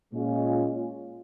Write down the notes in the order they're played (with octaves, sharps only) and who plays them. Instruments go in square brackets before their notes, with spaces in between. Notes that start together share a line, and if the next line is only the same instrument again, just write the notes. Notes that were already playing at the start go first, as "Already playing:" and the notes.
[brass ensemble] A#2 G#3 C#4 F4